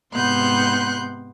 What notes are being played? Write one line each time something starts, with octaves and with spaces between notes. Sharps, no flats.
G#2 C3 B3 C6 F#6 G6